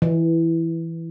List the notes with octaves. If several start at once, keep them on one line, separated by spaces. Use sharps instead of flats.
E3